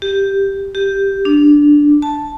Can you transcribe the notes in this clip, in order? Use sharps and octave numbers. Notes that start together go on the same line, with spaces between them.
G4
G4
D4
A5